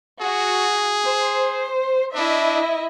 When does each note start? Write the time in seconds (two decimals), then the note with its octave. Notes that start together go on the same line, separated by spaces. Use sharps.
0.21 F#4 G#4
1.03 C5
2.15 D4 E4 D#5 E5